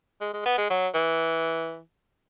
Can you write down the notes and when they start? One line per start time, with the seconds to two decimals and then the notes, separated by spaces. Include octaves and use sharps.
0.21 G#3
0.33 G#3
0.45 B3
0.58 G#3
0.70 F#3
0.94 E3